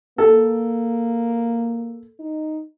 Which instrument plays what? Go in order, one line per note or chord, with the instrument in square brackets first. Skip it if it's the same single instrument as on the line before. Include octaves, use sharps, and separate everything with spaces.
[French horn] A#3 [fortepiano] A4
[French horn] D#4